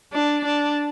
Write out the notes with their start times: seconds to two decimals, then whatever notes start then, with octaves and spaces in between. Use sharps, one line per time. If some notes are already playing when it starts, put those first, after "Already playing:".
0.13 D4
0.44 D4